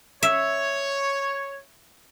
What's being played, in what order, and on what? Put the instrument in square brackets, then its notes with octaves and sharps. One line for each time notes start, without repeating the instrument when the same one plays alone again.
[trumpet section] C#5 [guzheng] E5